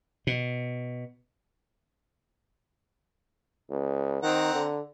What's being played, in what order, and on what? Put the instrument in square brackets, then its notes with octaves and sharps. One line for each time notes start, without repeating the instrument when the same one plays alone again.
[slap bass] B2
[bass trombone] C#2
[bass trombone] D#3 [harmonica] C4 F#5 A#5
[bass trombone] D3